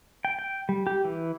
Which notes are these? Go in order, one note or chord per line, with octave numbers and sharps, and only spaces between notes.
G5
G5
G3
G4
E3